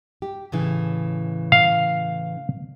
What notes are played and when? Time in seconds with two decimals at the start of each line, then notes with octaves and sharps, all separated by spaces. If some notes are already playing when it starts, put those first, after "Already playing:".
0.22 G4
0.52 A2 C#3 E3
1.52 F5